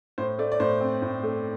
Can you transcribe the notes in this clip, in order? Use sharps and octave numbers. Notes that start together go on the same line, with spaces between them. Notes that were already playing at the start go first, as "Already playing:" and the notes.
A2 C5
A3 D5
D5
A2 C5
C4
A2
A3